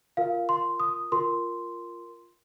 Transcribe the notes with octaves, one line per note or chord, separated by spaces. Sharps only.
F4 A#4 F5
C6
D#6
F4 A#4 C6